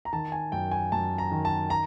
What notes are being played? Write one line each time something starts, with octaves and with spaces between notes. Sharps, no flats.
A#5
D#3 A5
G#5
F#2 G5
G#5
F#2 A5
A#5
D#3
A5
A#5